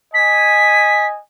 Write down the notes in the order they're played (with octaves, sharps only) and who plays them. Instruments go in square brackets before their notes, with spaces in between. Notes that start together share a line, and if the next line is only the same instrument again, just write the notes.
[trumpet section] D#5 G#5 [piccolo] B6